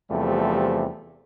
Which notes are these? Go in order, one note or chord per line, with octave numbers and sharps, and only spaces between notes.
E2 C3 F3 G3 A3